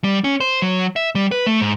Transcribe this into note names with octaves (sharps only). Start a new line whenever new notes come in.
G3
C#4
C5
F#3
E5
G3
B4
A3
G#2